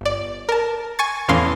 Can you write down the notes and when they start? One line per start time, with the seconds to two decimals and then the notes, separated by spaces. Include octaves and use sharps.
0.01 G1 D5
0.49 A#4 A5
0.99 G#5 C#6 A6
1.28 E2 A2 E3 C#4 F5 C6